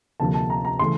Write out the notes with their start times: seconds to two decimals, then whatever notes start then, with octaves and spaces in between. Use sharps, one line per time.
0.20 D2 C3 F3 A#3 A5
0.34 A5
0.50 A#5
0.65 A#5
0.79 C#3 E3 A3 C6